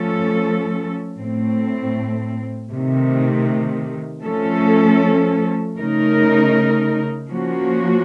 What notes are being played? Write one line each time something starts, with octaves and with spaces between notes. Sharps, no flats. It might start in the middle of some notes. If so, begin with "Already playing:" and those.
Already playing: F3 A3 C#4 A4
A2 A3 C4
C3 D#3 A3
F3 A3 C#4 A4
C#3 A3 D#4 A#4
F3 A#3 C#4 F#4